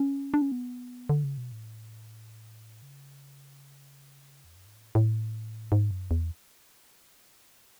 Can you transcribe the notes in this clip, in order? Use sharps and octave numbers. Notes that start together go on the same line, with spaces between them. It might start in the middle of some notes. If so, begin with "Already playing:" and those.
Already playing: C#4
D4
C#4
B3
D3
C#3
B2
A2
C#3
E2
F#2
G#2
A2
A2
G#2
F#2
E2